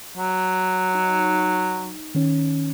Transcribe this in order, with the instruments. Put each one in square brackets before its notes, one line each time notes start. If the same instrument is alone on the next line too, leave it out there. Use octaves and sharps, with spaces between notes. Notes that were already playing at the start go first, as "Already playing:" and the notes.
[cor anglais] F#3
[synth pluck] D#4
D#3 C#4